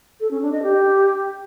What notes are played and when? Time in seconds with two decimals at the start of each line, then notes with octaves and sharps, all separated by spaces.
0.20 A4
0.31 C#4
0.42 D4
0.52 D#5
0.63 G4